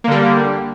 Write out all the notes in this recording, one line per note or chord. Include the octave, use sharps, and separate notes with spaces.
D3 G3 A#3